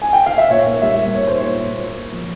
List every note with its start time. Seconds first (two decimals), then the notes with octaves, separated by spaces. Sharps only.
0.02 G#5
0.13 G5
0.26 F5
0.38 E5
0.50 A#2 C#5
0.67 A#3
0.82 G3 E5
0.98 G3
1.15 A#2 C#5
1.27 A#3 C5
1.40 C#5
1.48 A#2
1.63 A#3
1.80 A#3
1.96 A#3
2.12 F3